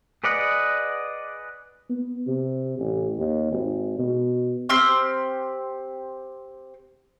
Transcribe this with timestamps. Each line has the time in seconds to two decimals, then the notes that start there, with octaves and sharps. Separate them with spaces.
0.24 G#4 B4 D5 D#5 F#5
1.89 B3
2.27 C3
2.79 A1
3.17 D#2
3.52 G#1
3.99 B2
4.69 C4 G4 C6 F6